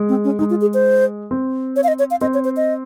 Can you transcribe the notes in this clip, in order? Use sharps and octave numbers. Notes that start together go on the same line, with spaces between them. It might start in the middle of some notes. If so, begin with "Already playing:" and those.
Already playing: G#3
C4
C#4
G#3 D#4
F4
G#4
C5
C4
C#5
F5
D#5
C#5
F5
C4 D#5
C#5
C5
D#5